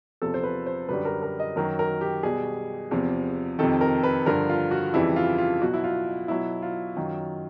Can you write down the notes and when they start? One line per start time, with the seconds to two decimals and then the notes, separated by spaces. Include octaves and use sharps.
0.22 E2 C3 F3 A4
0.34 C5
0.43 B4
0.66 C5
0.89 F#2 D3 G3 B4
1.05 A#4
1.23 A#4
1.39 D#5
1.56 F#2 D#3 F#3 A#4
1.79 A#4
2.01 G4
2.23 B2 G3 G#4
2.91 E2 C3 F3
3.59 F2 C3 D#3 A4
3.81 A#4
4.03 B4
4.26 G2 D3 F3 A#4
4.49 F4
4.71 F#4
4.94 F2 C#3 E3 G3 E4
5.16 F4
5.38 F4
5.62 B2 F#3 F#4
5.74 E4
5.84 F4
6.28 B2 F#3 E4
6.62 F4
6.96 F#2 D#3 F#3